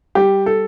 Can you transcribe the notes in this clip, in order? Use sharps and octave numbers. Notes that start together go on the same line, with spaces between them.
G3 G4
A4